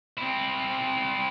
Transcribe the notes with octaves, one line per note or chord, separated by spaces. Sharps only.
C4 E4